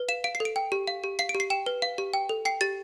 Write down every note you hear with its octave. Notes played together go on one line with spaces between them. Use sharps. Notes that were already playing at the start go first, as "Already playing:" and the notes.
Already playing: B4
F5 E7
F5 D7
C7
A4
D7
G5
G4
F5
G4
F5 C7
D7
G4
C7
G5 E7
B4
F5
G4
G5
A4
G5 C7
G4 A6